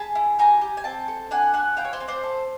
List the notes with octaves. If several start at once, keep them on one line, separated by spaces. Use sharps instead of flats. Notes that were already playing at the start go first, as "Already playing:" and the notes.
Already playing: G#4 A5 B5
E4
G4 G#5 A#5
G4
G#5
C4 G5 A5
A4
D4 F#5 G#5
F#4 F#5 G#5
E4 F5 G5
C#5
C5 D5
C4
C5 D5
A4